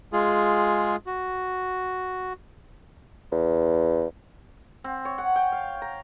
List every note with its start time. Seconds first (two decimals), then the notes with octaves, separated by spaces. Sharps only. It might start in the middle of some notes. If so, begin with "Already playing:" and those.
0.13 G#3 F4 G#4
1.07 F#4
3.32 E2
4.84 C4
5.05 C#5
5.18 F#5
5.36 G5
5.52 F5
5.82 A#5